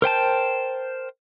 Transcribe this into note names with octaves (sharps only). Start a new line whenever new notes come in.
A#4 C5 G5 A5